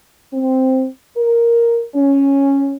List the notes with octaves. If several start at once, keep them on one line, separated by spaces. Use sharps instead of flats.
C4
A#4
C#4